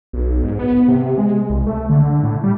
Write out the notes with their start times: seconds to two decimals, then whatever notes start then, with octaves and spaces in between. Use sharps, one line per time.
0.13 B1
0.43 G#2
0.59 B3
0.88 C3
1.18 G#3
1.50 C2
1.67 A3
1.90 D3
2.23 A2
2.43 G3